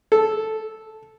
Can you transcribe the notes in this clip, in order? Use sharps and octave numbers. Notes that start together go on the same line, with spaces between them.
A4